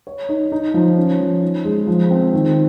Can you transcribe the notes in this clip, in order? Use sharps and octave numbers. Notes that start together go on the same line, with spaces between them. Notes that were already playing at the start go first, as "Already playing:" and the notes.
C#5
D#4
D#4
F3
C#4
F3
D#4
G#3
F3
C4
D#3